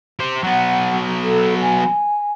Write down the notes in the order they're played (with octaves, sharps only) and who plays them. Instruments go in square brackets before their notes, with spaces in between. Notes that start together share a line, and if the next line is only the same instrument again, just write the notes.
[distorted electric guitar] G4 C5
[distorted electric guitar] F#3 B3 [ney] F#5
[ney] A4
G#5